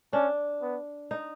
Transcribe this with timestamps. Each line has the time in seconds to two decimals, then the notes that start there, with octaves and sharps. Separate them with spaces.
0.13 C#4 D4
0.62 B3
1.11 D#4